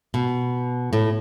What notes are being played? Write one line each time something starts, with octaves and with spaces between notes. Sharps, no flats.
B2
A2